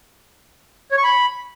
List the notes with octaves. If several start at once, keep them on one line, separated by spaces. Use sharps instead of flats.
C#5
C#6
B5